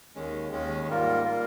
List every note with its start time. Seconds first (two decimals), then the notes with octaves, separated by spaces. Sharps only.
0.15 D#2 D#3 G#3 C#4
0.51 D#2 D#3 G#3 C#4
0.88 G#2 G3 A#3 F4 A#4
1.24 G3 A#3 F4 A#4